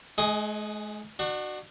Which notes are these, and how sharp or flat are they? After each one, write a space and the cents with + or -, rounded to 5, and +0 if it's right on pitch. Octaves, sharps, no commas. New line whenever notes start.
G#3 +40 D#4 +0 G#4 +0
D4 +40 F#4 +0